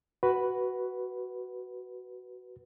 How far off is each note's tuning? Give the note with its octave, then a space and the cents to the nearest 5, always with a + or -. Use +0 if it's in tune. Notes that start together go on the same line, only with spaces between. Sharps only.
F#4 +10 B4 +0